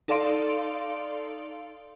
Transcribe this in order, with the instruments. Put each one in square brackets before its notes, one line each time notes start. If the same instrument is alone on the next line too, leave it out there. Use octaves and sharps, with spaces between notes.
[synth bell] D#4 A4 D5 F5 C6 D7